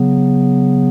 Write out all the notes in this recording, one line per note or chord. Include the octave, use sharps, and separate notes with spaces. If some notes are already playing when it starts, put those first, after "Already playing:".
Already playing: C#3 F#3 B3